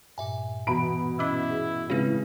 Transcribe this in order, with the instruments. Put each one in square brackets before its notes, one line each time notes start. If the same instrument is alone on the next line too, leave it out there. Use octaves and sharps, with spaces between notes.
[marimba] G2 A#2 [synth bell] E5 G#5
[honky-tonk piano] B2 B5 D7 [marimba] E3 A#5
[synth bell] C#4 D6 E6 [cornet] E4 [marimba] D#5 E5
[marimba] G#4
[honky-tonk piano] A2 C#3 [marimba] G#3 B4 [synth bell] C4 F4